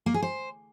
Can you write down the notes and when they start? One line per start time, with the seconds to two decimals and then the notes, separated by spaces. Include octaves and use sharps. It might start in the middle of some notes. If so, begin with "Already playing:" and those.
0.06 A#3
0.14 G#4
0.22 C5